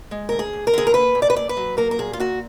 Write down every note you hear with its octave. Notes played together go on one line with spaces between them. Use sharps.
G#3
D2 A#4
G#4
D2
A#4
D3 G#4
A#4
A#3 B4
A#2
D5
B4
A#2 D5
B4
F#3
A#3 A#4
A#4
A#2 G#4
F4
A#2 F#4